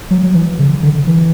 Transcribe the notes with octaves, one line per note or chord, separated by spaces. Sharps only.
F#3
F#3
E3
C#3
D3
E3